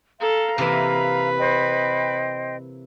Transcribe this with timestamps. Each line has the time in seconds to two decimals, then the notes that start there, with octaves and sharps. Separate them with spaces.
0.20 A4 F5 A#5
0.58 C3 E3 A#3 B4 B5
1.39 C5 D#5 G5